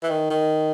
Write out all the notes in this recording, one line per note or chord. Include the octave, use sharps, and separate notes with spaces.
E3
D#3
D#3